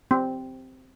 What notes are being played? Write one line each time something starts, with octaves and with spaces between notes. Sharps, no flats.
C4